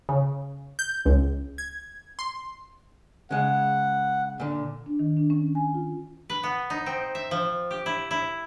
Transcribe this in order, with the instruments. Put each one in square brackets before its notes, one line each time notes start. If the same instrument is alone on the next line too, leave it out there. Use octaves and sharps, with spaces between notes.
[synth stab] C#3
G6
C#2
G#6
C6
[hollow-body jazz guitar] C#3 G#3 [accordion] F#5
[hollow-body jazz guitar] A#2 D3
[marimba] D4
D#3
D4
C#4
G#5
F4
[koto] B4
B3
D#4
C4
E5
F3
G4
E4
E4